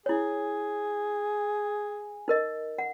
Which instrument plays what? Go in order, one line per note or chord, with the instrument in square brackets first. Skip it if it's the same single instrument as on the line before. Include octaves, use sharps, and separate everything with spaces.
[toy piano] E4 C#5 [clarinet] G#4 [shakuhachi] G#5
[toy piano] D#4 A#4 D#5
F#5